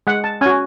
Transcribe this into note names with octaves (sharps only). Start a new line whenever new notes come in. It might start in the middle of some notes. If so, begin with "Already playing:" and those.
G#3 F#5
A5
C#4 F#4 G#5